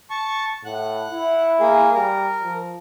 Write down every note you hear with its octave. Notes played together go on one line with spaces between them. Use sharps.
A5 C#6
A2 F#5 F#6
E4
A#3 G#4
G3 A#4
F3